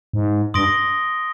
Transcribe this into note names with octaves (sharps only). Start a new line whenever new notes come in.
G#2
G2 C6 D#6 A#6 D7 G7